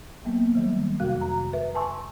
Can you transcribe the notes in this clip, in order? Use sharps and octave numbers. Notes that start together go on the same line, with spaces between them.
F#3 A#3 B3
D#3 F#3 G3
F2 C3 F#4 F5 F#6
A#5
B4 E5
G#5 A5 C6 C#6 E6